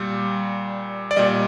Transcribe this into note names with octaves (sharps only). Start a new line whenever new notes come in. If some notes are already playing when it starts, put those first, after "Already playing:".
Already playing: A#2 G3
D5
A#2 G3 D#5